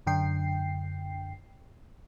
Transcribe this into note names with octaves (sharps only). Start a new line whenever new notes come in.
F#2 D3 G5 C7